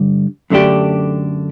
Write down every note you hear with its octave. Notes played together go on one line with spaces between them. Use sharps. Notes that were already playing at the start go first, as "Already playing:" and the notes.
Already playing: G2 D3
F#2 D3 A3 D4 G4